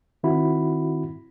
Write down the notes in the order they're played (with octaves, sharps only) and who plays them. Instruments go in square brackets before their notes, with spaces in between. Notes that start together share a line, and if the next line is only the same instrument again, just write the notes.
[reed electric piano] D#3 C4 E4 F#4 B5